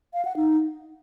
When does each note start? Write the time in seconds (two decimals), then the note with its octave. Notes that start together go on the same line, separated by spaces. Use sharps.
0.14 F5
0.25 F#5
0.36 D#4